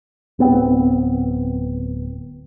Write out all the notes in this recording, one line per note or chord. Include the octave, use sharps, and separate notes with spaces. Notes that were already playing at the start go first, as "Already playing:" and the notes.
D1 B3 C4